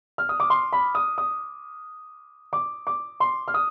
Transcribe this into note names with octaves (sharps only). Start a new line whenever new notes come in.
F6
D#6
D6
C6
B5
D#6
D#6
D6
D6
C6
F6
D#6